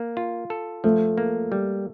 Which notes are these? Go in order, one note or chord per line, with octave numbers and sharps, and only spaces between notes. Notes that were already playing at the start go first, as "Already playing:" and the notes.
Already playing: A#3
F4
A4
F3 A3
A#3
G3